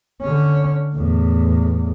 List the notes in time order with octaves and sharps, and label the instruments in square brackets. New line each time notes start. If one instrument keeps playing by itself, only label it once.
[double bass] D3 C#4
E2 A2